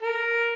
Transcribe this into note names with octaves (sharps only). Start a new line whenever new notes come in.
A#4